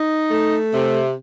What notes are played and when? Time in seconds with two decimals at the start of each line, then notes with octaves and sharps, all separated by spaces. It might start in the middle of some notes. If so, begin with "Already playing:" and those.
Already playing: D#4
0.31 A3
0.73 C3